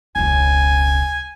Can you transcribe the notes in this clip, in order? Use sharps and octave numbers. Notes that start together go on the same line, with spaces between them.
E1 C#2 G#5